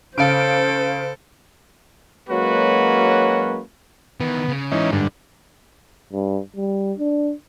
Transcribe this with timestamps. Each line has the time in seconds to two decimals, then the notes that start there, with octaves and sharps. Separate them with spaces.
0.18 C#3 A4 C5 F5 D7
2.29 F#3 G#3 A#3 C#4 F#4 B4
4.20 D#3 E3 B3
4.48 C#3
4.72 G#2 E3 C#4 D#4
4.93 G2 D3
6.12 G2
6.56 G3
6.98 D4